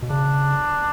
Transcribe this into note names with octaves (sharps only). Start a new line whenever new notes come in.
B2
C#3 D4